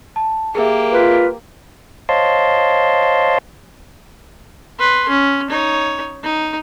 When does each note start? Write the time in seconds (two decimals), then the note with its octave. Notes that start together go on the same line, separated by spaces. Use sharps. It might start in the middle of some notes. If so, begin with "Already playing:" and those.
0.16 A5
0.55 A#3 G4 G#4 A#4 E5
0.92 F4 B4
2.09 C5 C#5 D#5 F5 A5 C6
4.79 B4 C6
5.09 C#4
5.50 D#4 C#5
6.24 D#4